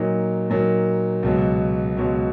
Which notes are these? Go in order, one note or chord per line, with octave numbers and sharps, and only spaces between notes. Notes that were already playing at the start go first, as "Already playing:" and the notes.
Already playing: A#2 F#3 A#3 D#4
A#2 F#3 A#3 D#4
C#2 B2 F#3
C#2 B2 F#3